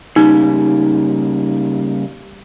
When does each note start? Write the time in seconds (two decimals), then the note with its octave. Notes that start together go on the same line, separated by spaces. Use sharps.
0.16 C#3 G3 A#3 D#4